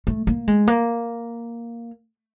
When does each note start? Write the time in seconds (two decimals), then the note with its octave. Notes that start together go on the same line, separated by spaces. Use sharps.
0.07 A3
0.27 A#3
0.47 G#3
0.67 A#3